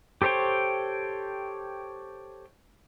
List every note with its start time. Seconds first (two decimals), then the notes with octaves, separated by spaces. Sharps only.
0.22 G4 A4 C5 C#5 G5